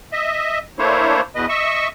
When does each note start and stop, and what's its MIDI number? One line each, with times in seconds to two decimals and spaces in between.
0.12 0.59 75
0.12 0.59 76
0.79 1.21 57
0.79 1.21 58
0.79 1.21 62
0.79 1.21 64
0.79 1.21 72
0.79 1.21 73
1.35 1.46 40
1.35 1.46 47
1.35 1.46 71
1.35 1.46 75
1.49 1.88 75
1.49 1.88 76
1.49 1.88 85
1.49 1.88 88